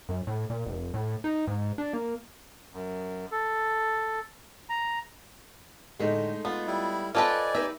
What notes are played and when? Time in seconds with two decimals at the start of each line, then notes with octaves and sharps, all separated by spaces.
0.09 F#2
0.27 A2
0.50 A#2
0.66 F1
0.94 A2
1.24 D#4
1.47 G#2
1.78 D4
1.93 A#3
2.73 F#2
3.31 A4
4.69 A#5
5.99 A2 D3 G#3 A3 D#4
6.45 B3 F4
6.67 G3 E4
7.15 F4 A4 B4 C5 D5 D#5 G5 G#5
7.55 D#4 G4 B4 E5